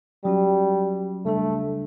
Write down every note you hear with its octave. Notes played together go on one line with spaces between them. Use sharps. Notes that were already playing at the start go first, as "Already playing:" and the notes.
F#3 G3 C#4 F#4
C#3 G3 A3 D4 A4